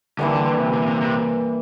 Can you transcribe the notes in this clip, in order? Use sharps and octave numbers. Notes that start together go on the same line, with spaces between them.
G2 D3 E3 A#3
C3
C3
C3
C3